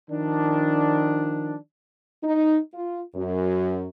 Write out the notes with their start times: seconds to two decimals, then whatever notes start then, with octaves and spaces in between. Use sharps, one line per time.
0.10 D#3 F3 D4
2.23 D#4
2.74 F4
3.15 F#2